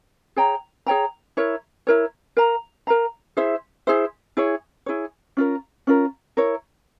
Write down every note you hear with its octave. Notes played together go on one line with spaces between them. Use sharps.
G#4 C#5 G5 A#5
G#4 C#5 G5 A#5
E4 A#4 C#5
E4 A#4 C#5
A#4 F5 A#5
A#4 F5 A#5
E4 G#4 C5 E5
E4 G#4 C5 E5
E4 G#4 C#5
E4 G#4 C#5
C#4 F4 A#4
C#4 F4 A#4
E4 A#4 C#5